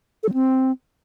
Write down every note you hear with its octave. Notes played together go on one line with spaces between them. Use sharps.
A4
F#3
C4